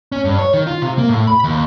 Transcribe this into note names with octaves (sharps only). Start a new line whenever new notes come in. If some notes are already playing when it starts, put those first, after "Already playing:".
C#4
G2
C#5
D#3
F4
C3
A#3
A2
B5
D#2